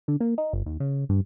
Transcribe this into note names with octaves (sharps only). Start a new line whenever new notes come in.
D3
A#3
D#4
G1
D#2
C#3
G2